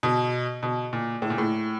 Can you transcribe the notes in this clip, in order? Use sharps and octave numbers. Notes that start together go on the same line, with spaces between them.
B2
B2
A#2
A2
A#2
A2